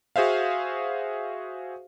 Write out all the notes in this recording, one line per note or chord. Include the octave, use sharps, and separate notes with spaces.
F#4 G#4 C5 E5 F5